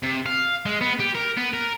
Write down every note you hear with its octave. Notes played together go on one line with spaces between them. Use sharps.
C3
F5
G#3
B3
G4
A#4
B3
A#4